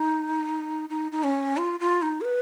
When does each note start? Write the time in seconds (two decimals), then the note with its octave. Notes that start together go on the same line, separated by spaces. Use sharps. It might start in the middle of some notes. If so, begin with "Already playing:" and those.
Already playing: D#4
0.89 D#4
1.12 D#4
1.24 C#4
1.57 F4
1.80 F4
2.02 D#4
2.21 A#4
2.25 B4